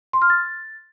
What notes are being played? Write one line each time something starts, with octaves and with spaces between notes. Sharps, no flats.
C6
F6
A6